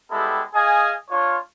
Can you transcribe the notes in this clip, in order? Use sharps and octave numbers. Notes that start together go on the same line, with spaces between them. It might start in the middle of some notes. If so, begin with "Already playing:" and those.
G3 G#3 B3 E4 G4 A4
G#4 D#5 F5 G#5
D4 F4 C#5